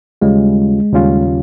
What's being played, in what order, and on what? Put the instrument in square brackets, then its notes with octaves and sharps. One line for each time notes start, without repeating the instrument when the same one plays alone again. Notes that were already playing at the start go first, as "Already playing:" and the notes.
[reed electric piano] D#2 C#3 G3 C#4 F4 [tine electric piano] G#3
[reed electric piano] D#2 C#3 G3 C#4 F4